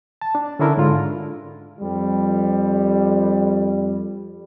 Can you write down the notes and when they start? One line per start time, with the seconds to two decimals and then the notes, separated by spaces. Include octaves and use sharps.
0.21 A5
0.35 D4
0.59 D3 C#4 D4 E4 A#4
0.77 G#2 D3 F4
1.80 F2 G3